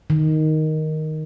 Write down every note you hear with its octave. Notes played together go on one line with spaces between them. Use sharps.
D#3